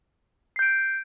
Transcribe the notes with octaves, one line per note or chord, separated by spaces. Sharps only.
G6 C7 D7